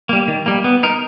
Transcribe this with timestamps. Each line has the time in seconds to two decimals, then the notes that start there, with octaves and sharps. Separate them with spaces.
0.09 G3 A#3
0.28 D#3
0.46 G3 A#3
0.64 B3
0.83 D#4 A#4